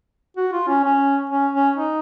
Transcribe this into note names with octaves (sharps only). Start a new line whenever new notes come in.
F#4
F4
C#4
C#4
C#4
C#4
D#4